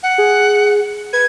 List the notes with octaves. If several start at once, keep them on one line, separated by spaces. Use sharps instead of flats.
F#5
G#4
B4 G#6